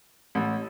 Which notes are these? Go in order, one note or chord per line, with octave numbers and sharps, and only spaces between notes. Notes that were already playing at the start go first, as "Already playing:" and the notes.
A1